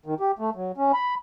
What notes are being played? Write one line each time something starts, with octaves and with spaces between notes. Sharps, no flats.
D#3
G4
A3
F#3
C#4
B5